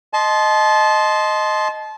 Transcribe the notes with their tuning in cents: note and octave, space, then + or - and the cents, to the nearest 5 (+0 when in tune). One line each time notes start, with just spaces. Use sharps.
D#5 +0 A5 -25 C6 +0